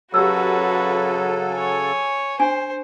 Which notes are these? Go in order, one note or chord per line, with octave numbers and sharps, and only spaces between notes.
C#3 F#3 F#4 G4 A4 B4 E6
C#5 G#5
D4 C5 G#5